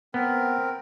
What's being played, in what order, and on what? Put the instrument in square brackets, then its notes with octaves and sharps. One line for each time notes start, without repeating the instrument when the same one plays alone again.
[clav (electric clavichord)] B3 [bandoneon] C4 A#4